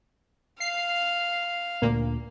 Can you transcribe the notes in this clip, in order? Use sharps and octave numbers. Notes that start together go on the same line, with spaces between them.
F5 C7
D2 A#2 A#3